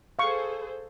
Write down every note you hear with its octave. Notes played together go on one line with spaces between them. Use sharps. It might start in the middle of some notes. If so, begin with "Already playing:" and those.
G#4 A4 C5 F5 C#6